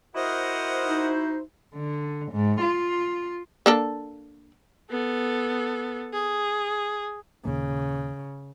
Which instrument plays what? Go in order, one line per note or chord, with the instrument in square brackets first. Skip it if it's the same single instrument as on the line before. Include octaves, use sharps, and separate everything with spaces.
[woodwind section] E4 F#4 C5 [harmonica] A#4 D#5 F#5
[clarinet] D#4
[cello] D3
G#2
F4
[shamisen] A#3 D4 A4
[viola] B3 A4
G#4
[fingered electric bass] D#2 A#2 A#3 [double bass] C#3